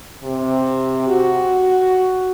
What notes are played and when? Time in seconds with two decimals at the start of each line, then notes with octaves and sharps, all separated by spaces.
0.23 C3
1.08 F#4